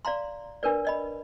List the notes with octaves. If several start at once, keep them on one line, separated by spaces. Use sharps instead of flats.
D5 F5 A#5 C6
D4 A#4 B4 D5
D5 D#5 B5